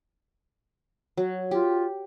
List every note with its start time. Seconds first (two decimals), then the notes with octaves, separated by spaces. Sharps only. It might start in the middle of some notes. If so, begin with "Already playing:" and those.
1.17 F#3
1.51 F4 G4